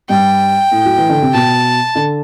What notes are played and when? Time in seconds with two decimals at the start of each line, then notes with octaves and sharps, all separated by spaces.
0.09 G2 G5
0.71 A2
0.86 F#3
0.97 E3
1.09 D3
1.22 C3
1.34 B2 A5
1.95 D3